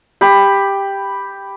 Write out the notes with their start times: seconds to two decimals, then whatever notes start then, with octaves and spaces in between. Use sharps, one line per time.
0.21 G4 B5